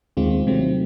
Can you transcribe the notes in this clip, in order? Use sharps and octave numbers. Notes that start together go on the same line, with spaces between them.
D#2 D#3 G#3 C4 F4
C3 D#3 F#3 A3 C4